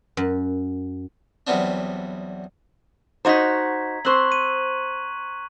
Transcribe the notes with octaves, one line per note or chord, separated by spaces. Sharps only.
F#2
E2 F#3 G3 B3 C4 D4
D#4 F#4 C5 A#5 G#6 B6
C4 C5 C#6 F#6 F#7
D#7